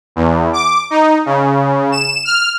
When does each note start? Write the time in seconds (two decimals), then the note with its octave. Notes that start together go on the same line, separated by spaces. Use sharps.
0.16 E2
0.53 D6
0.90 D#4
1.26 C#3
1.92 E7
2.25 F6